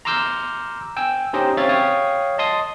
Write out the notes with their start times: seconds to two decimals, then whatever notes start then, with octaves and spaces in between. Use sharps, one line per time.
0.05 A#5 C6 D6 E6 F6 G6
0.97 G5 G#5 E6
1.33 C#4 D#4 G4 C5 D#5 G5
1.57 C4 C#4 C#5 E5 F5 A6
1.69 C#5 F5 G5 D#6
2.38 D#5 A5 C6 D#6